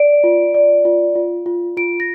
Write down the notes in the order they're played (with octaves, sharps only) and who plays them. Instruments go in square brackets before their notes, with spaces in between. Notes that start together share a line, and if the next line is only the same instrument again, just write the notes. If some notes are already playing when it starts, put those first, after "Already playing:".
Already playing: [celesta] D5 D7
F4
D5
F4
F4
F4
F4 D7
A#6